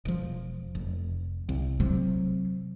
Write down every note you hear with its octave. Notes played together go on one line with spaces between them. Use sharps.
E1 F3
F1
C2
C3 F#3